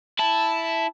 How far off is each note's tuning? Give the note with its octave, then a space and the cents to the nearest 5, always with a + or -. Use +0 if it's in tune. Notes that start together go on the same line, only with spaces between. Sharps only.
E4 +0 A5 -5